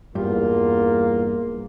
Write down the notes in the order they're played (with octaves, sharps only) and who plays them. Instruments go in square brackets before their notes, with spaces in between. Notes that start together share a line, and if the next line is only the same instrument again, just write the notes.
[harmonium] E2 F4 [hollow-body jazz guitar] G2 [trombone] A#3